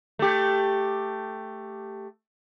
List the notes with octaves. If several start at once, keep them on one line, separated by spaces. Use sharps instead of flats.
A3 G4